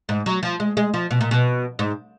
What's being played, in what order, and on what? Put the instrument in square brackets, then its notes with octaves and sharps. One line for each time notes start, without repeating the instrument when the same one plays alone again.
[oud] G#2
F#3
F3
G#3
G#3
F3
B2
A#2
B2
G#2